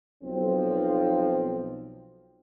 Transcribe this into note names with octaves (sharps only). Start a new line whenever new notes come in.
B1 F3 C4